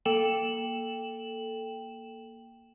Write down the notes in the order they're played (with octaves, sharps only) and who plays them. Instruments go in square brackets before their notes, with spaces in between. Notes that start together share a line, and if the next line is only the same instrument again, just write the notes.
[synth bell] A#3 A4 G5 E7 F#7